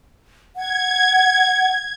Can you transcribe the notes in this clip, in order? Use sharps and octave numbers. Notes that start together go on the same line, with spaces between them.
F#5 G#6